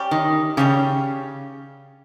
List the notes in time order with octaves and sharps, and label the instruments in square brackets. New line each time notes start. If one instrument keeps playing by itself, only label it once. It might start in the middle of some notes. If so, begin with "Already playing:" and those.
Already playing: [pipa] G3 C#4 G4
[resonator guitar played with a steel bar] D#3
[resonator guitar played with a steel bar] C#3 [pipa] G3 C#4 G4